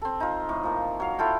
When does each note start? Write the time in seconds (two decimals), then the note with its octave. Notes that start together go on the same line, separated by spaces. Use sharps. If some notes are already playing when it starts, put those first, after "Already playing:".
0.02 C4 A4
0.20 D#4 F4
0.49 A2
0.63 F3 A#3
1.00 F#3 F5
1.19 E4 F4 A4 G5